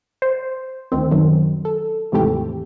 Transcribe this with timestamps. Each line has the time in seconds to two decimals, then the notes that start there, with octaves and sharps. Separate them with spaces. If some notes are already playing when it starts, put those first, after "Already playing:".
0.22 C5
0.92 D2 D#3 C4
1.11 F#2 D#3 F#3
1.65 A4
2.12 D#2 G#2 C3 E3 A3 G4